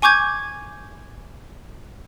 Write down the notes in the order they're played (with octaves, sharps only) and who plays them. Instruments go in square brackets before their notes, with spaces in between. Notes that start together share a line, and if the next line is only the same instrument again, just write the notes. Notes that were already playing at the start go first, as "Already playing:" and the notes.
[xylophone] G#5 C#6 D6 G6 G#6